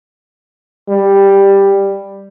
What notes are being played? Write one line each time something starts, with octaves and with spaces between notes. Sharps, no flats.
G3